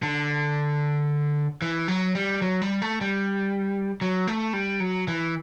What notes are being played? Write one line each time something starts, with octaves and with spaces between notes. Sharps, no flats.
D3
E3
F#3
G3
F#3
G3
A3
G3
F#3
A3
G3
F#3
E3